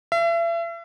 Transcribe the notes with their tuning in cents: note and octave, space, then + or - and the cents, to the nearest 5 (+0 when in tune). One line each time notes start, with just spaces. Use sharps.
E5 +40